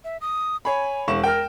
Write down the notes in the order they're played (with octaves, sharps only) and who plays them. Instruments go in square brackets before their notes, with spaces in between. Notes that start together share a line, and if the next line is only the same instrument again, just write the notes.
[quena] E5
D#6
[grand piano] C#5 B5 [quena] G#5
[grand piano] E1 C#6 E7
[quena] A#4 [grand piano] G5 F6